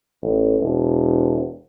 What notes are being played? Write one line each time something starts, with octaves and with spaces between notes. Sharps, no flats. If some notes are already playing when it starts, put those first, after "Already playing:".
A1
E1